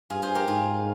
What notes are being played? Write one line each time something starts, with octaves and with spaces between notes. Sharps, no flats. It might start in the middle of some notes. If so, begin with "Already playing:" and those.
G2 F4 G#4
G#4 C5
G4 A#4
G#2 F4 G#4